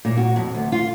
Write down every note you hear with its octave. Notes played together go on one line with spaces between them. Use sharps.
A#2
F#4
F2
D2
F4